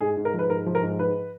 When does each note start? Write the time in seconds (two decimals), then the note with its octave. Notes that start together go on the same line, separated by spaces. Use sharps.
0.01 G#2 G#4
0.17 G#2
0.25 A#4
0.34 F3
0.39 B4
0.50 G#2 A#4
0.66 F3
0.75 A#4
0.83 G#2
0.99 G#2 B4